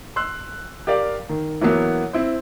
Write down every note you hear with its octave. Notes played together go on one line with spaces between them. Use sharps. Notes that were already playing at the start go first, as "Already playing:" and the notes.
C6 E6 F#6
G4 A#4 D5 F5
D#3
E3 F#3 A#3 B3
C4 E4 C5